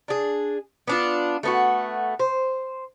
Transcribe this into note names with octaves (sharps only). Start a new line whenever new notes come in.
D4 G#4
B3 D4 F4
A3 B3 F#4
C5